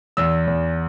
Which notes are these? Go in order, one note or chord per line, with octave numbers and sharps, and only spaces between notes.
E2 E6
E2